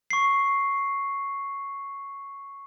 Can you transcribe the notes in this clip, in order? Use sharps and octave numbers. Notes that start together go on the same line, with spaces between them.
C#6 C7